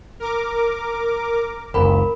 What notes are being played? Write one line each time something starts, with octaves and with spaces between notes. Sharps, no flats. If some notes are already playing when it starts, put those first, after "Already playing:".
A#4 D6
F#1 C#2 A#4 B5